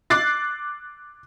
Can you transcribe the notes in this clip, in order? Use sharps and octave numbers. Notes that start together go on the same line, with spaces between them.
D6 F#6 A6 C7